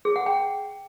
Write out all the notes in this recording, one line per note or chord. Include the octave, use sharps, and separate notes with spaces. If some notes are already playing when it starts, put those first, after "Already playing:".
G#4
F#5
G5